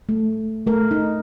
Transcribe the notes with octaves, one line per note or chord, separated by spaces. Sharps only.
A3
A3 A#4
D#4